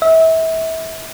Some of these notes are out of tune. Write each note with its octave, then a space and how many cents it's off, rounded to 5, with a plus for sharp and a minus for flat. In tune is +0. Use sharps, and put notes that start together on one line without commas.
E5 -30